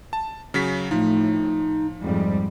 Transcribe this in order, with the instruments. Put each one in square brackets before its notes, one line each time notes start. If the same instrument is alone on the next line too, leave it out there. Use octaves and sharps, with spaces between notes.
[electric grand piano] A5
C#3 F#3 B6
[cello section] A2 [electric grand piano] F3 [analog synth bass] D#4
[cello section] F2 G#2 G3